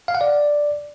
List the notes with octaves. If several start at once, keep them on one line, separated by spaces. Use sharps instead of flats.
F5
F#5
D5